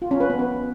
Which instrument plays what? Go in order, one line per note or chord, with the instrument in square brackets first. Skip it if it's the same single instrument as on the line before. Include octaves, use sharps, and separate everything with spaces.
[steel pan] F4
C#4
B4
B3
B4